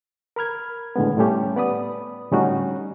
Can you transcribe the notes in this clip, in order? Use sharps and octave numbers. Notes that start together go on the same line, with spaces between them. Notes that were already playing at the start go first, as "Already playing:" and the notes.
A#4 B5 F6 G#6
A2 D3 G#3 B3
A2 G3 A3 C#4 G4
B3 D5 B5 D#6
A2 D3 G3 C#4 D#4 F#4